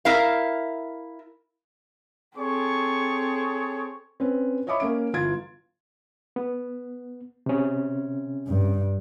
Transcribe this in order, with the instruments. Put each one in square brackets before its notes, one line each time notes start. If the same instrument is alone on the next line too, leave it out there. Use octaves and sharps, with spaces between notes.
[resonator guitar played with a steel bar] E4 A#4 F5
[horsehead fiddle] C4 A4 [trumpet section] G#4 C#5 C#6
[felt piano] C4 C#4 B4
C#5 D#5 E5 B5 C#6 D6
A#3 C#4 D7
G1 E3 F4 G#6 A6 D7
[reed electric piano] B3
C3 C#4
[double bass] G2